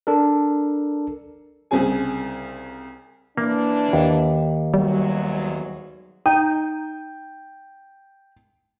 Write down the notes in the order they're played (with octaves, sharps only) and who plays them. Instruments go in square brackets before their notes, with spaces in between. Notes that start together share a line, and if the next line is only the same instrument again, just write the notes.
[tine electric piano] D4 A4 A#4
[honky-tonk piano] C2 C#3 C4 G#4 G#5
[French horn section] E3 D4 [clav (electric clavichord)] A#3
[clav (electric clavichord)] D#2
[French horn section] E2 G#2 F#3 [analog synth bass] G3
[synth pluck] D#4 [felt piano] G5